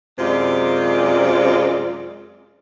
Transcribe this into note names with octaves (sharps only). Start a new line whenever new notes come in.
F#2 C3 G#3 F4 D5